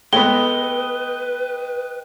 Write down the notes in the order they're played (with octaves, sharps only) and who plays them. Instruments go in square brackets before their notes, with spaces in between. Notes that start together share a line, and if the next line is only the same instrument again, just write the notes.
[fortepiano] G#3 A3 B3 [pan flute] B4 [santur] D#5 G5 [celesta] G7